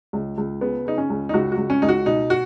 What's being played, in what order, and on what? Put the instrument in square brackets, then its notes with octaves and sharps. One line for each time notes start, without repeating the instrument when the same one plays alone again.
[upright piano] C#2
C#2
C#3 B3
C#3 D#4
C#4
C#2
D#4
C#2 F#4
F#4
C#2
C#4
C#2 D#4
F#4
B2 D#4
F#4